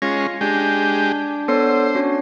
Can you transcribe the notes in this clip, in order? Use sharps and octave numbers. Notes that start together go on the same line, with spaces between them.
G#3 C#4 F4 A#6 C7
G#3 D4 G4
B3 A4 C5 C#5
C#4 F#4 C#5